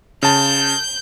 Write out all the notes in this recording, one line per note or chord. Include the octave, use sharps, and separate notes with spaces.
C#3 A5 G6